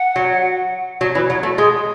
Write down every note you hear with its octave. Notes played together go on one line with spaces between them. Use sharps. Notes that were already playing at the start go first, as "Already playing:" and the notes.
Already playing: F#5
F#3
F#3
E3
F#3
A3
G#3